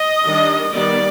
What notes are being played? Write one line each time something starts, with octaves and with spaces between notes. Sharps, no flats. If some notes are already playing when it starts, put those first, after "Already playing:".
Already playing: D#5
D#3 G3 D4
D#3 G3 B3 D5